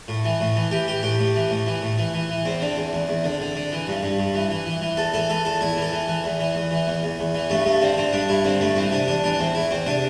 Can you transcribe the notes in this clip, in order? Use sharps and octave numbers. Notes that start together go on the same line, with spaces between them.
A2
E3
A2
E3
E3 G4
E3 G4
A2 G4
A2
E3
A2
E3
A2
E3
E3
E3
E2 C4
D3
E2
E2
E2
D3
D3
D3
E3
G2
G2
G2
E3
E3
E3
E3
E2 A4
E3 A4
E3 A4
E2 A4
E2 E4
E3
A4
E3
E3
E2
E3
E2
E3
E2
E2
E2
E3
G2 A3
G2 A3
D3 C4
D3 C4
G2 D4
G2 E4
D3 C4
G2 A3
E3 C4
C3 D4
E2 D4
E3 D4
E2 C4
E2 E4
E2 C4
C3 D4